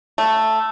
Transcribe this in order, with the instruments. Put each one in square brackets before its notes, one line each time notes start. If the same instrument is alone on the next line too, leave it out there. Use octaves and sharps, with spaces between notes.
[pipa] A3